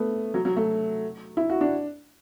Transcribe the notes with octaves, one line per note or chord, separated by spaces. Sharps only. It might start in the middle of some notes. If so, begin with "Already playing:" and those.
Already playing: A3 B3
F#3
F#3
A3
E4
F#4
D4